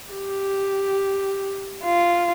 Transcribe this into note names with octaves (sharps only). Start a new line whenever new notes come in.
G4
F4